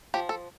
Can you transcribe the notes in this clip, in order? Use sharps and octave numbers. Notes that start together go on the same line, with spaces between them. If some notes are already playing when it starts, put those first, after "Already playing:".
F3 G4
A4